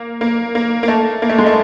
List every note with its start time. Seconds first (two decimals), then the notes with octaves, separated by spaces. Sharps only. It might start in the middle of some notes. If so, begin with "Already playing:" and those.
Already playing: A#3
0.21 A#3
0.55 A#3
0.83 A#3
0.88 A3
1.22 A#3
1.29 A3
1.38 G#3
1.47 A3